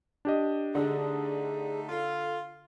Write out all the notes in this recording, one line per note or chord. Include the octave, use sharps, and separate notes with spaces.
D4 G4 D#5
D3 A3 D#4 G#4
F4 A4